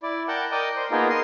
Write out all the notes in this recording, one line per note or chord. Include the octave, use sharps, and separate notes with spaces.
E4 D5
A#4 F#5 G5 A5
A#4 D5 D#5 G5
C5
A#3 B3 D#4 F4 G#4 A#4
A#4 D#5 C6